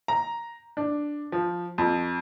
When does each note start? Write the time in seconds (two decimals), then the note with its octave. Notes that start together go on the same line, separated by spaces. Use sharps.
0.08 A#5
0.77 D4
1.32 F3
1.78 F2